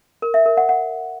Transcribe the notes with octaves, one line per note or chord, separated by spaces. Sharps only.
A#4
E5
A#4
F#5
F#5